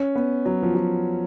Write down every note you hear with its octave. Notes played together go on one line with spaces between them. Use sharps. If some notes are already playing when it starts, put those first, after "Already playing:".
Already playing: C#4
B3
F#3
F3
F#3